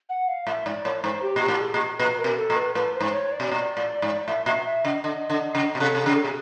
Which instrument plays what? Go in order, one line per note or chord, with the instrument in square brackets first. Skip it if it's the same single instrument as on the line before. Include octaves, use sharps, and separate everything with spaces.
[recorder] F#5
F5
[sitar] A2 [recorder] E5
[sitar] G#2 [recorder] D5
[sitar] A2 [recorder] C#5
[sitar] G#2 [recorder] C5
[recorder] G4
[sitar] A#2
[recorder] G4
[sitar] A2
[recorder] G#4
[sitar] A#2
[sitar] A#2 [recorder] B4
[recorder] A#4
[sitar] B2
[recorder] A4
[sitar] A#2
[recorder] B4
[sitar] A2 [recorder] B4
[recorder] C5
[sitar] G#2
[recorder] C#5
D5
[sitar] B2
A#2
A2
G#2
[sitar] A2 [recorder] E5
[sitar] A#2 [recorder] E5
[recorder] E5
[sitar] C#3 [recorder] D#5
[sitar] D3 [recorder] D#5
[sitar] D3
C#3
B2
[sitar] C3 [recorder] A4
[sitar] C3
[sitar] C#3 [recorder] G#4
[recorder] A4
[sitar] B2 [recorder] G#4